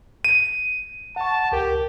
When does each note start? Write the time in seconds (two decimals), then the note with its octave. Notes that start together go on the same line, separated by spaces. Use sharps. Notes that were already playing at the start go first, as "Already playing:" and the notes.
0.24 D#7
1.16 F#5 A5 C#6
1.52 C#2 G4 A#4 G5